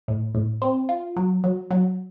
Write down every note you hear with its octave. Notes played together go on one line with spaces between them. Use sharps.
A2
A2
C4
F4
F#3
F#3
F#3